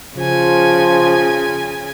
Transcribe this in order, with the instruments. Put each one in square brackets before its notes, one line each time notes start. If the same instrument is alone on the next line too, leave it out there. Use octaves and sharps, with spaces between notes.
[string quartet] C#3 G#5 [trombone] F3